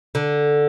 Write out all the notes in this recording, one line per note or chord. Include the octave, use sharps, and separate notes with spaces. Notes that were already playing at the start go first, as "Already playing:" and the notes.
D3